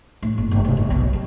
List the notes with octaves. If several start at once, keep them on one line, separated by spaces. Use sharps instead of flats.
A2
F#1
G1
E1
G#1
B1
G3